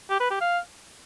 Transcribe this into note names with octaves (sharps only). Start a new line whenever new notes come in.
G4
B4
G4
F5